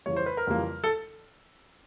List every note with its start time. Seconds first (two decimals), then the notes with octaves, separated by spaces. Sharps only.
0.06 F2 C#3 E3 G3 A#3 C#5
0.16 C5
0.26 B4
0.37 A#4
0.47 F2 C#3 E3 G3 A#3
0.84 A4